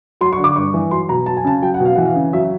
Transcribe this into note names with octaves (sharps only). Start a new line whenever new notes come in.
F#3 C6
C#6
D3
D6
G2 C#6
E3
F#3 C6
B2 A#5
F#3 A5
G#5
C#3 A5
F#3 G5
F#5
B2
F5
E3 F#5
F5
C#3
F#3 E5